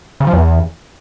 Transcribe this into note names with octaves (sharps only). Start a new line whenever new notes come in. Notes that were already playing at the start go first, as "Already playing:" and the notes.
C#3
F3
E2